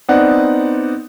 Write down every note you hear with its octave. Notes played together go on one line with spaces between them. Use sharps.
B3 C4 D#4 D5 F#5